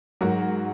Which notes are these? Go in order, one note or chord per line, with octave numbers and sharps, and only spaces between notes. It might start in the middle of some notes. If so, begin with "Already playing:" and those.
G#2 F#3 F#4 A#4